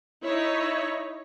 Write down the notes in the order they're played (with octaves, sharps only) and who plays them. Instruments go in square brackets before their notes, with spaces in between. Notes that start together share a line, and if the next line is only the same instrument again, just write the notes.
[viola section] D#4 E4 C#5